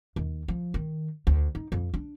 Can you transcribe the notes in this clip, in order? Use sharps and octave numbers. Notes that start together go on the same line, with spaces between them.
D#2
F3
D#3
D2
D#4
F2
D4